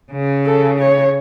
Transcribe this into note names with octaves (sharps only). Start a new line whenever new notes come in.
C#3
A4
C#5